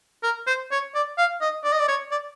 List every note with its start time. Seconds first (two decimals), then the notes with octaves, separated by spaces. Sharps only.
0.23 A#4
0.47 C5
0.71 C#5
0.95 D5
1.18 F5
1.42 D#5
1.64 D5
1.72 D#5
1.80 D5
1.88 C#5
2.12 D5